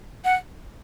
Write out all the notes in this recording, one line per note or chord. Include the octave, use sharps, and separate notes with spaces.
F#5